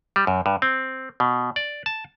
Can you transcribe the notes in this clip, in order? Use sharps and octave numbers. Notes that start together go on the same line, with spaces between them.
G3
F#2
G2
C4
B2
D5
A5